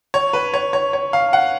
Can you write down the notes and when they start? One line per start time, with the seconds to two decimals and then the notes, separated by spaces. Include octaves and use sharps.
0.14 C#5
0.33 B4
0.54 C#5
0.73 C#5
0.93 C#5
1.13 F5
1.33 F#5